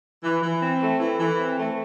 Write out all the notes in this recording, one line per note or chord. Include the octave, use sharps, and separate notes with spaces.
E3
E3
C4
A3
E3
E3
C4
A3